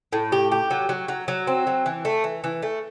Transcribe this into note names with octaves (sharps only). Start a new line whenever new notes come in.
A2
G4
G4
F#3
F#3
F#3
F#3
C4
F#3
E3
A3
E3
E3
A3